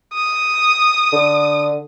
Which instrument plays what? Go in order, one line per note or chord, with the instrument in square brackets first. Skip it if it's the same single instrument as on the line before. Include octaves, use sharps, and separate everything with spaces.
[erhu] D#6
[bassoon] D3